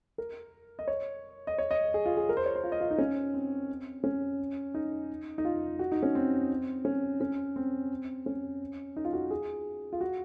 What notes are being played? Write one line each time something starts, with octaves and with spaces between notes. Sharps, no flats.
A#4
D#5
C#5
D#5
C#5
D#5
G#4
F4
G#4
A#4
C5
C#5
C5
F4
D#5
F4
D#4
C#4
C4
C#4
D#4
D#4
F4
F#4
D#4
C#4
C4
C#4
C#4
C4
C#4
D#4
F4
F#4
G#4
F4
F#4